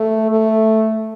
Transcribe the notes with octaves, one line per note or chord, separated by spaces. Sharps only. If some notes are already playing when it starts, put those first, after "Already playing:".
Already playing: A3
A3